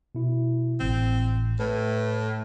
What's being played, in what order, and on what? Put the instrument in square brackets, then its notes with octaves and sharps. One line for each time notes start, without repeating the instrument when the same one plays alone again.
[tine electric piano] B2 E4
[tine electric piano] G#1 A2 E3 [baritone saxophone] C4
[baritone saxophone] A2 [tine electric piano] B4